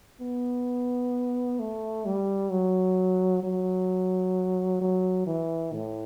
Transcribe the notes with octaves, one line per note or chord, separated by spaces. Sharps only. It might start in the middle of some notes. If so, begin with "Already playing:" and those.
B3
A3
G3
F#3
F#3
F#3
E3
A2